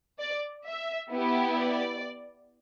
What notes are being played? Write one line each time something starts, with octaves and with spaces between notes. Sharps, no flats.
D5
E5
B3 E4 G4
D5